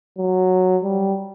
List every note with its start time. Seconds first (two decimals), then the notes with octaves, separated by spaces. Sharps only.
0.18 F#3
0.84 G3